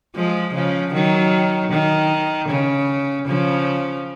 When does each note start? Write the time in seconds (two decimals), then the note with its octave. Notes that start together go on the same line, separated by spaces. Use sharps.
0.15 F3 G#3
0.54 C#3 F3
0.94 D#3 F#3
1.71 D#3
2.49 C#3
3.27 C#3 F3